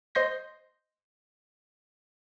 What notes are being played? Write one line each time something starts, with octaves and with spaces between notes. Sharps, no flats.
C5 D#5 C6 G6 A#6